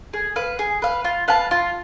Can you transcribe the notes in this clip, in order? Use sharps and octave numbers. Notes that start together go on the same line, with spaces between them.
G#4
B4 F5
G#4
B4 F5
F4
B4 F5 A5
F4